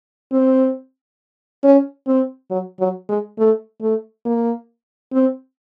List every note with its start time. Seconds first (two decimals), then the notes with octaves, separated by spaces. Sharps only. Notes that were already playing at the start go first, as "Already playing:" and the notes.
0.32 C4
1.64 C#4
2.07 C4
2.50 F#3
2.80 F#3
3.09 G#3
3.38 A3
3.81 A3
4.25 A#3
5.13 C4